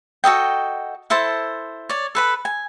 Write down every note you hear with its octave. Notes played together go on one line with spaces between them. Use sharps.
F#4 A4 D#5 G5
E4 A4 C5 A5
C#5 D5
A4 B4 B5
G#5